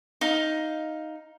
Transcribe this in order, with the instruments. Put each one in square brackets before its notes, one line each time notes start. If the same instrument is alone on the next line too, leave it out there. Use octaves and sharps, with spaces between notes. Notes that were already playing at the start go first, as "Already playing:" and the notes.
[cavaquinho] D#4 F5